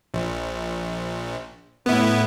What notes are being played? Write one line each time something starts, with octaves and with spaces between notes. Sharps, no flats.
A#1
A2 B3 E4